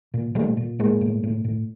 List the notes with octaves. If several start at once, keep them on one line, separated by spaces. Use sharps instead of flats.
A#2
A#2 G3 A3
A#2
A2 G#3 A#3
A2
A2
A2